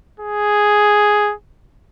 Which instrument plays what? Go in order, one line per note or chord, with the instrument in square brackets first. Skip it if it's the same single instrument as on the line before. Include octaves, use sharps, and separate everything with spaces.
[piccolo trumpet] G#4